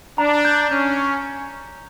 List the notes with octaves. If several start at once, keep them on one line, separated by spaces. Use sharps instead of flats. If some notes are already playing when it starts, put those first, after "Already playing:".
D4 A#5
G6
C#4 G6